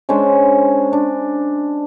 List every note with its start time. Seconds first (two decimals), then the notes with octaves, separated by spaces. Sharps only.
0.09 G#3 C#4 D4 C5
0.93 D4